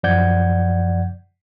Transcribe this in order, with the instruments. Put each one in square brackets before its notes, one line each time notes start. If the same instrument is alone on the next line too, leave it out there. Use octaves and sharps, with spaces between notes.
[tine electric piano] F#2 F3 D5 F#5 G6 G#6